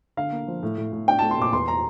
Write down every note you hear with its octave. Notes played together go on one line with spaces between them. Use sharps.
D3 F5
A#3
F3
A2
A2
A2
D4 G5
A3 A5
C6
A#2 D6
E2 C6
A#5